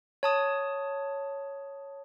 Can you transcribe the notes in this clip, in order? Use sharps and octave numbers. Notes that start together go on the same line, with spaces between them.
C#5 A5 D#6